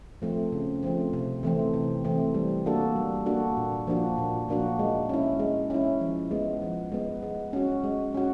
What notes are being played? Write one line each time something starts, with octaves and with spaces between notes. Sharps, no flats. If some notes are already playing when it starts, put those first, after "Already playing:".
F3 A3 C4
C#3
F3 A3 C4
C3
E3 A3 C4
C3
E3 A3 C4
G3
A#3 D4 F#4 A4
G3
A#3 D4 F#4 A4
A#2
F3 A#3 D4 F#4
A#2
F3 A#3 D4 F#4
G#3
C#4 E4
G#3
C#4 E4
F3
G#3 B3
F3
G#3 B3
G#3
C#4 F#4
G#3
C#4 F#4